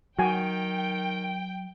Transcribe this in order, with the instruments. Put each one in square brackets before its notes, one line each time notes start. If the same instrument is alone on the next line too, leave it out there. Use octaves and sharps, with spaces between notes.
[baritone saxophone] D#3 [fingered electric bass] F#3 [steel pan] F#4 G#5 [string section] G5